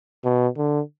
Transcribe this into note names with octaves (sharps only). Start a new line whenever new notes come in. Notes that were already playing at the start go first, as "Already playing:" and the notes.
B2
D3